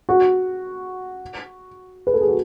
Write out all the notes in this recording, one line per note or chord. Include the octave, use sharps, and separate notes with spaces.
F#4
B4
A4
G#4
F#4